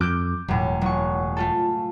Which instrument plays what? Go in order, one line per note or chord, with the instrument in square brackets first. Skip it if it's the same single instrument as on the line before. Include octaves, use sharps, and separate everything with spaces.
[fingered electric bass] F2 [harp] D6 G6
[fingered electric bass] E1 [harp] F#2 A2
[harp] F#1 C#6
A3 F4 A4